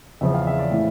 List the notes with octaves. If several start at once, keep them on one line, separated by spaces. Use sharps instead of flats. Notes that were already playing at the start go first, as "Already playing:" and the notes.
E2 C#3 F3 E5
F5
E5
D5
A2 E3 E5